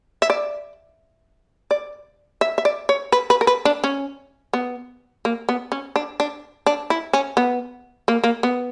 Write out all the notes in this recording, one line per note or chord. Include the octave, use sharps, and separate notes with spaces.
E5
D5
D5
E5
E5
D5
C#5
B4
B4
A#4
B4
D4
C#4
B3
A#3
B3
C#4
D4
D4
D4
E4
C#4
B3
A#3
A#3
B3